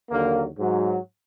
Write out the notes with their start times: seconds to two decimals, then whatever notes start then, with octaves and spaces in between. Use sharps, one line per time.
0.10 D#2 D3 F#3 A#3
0.59 G#2 F#3